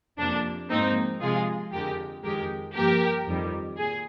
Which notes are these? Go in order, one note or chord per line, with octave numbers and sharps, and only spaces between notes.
F2 C3 F3 A#3 D4
G#2 F3 A#3 C4 D#4
C3 F3 G#3 F4 G#4
F2 D3 G#3 G4 A#4
F2 D#3 G#3 G4 A#4
G2 F3 A#3 G4 A#4
F2 D#3 G3
A#2 G#4